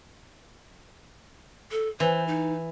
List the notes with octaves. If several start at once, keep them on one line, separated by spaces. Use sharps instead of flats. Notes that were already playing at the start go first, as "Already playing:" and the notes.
A4
E3 C5
D#4